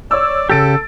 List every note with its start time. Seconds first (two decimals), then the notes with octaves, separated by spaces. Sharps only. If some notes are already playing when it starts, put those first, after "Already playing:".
0.11 C#5 D5 E6
0.49 C#3 E3 G4 A4 E6 A6 D7